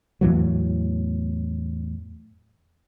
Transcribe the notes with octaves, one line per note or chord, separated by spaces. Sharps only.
E2 A2 E3 F#3